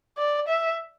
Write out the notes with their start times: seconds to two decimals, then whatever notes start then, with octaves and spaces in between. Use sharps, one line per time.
0.18 D5
0.48 E5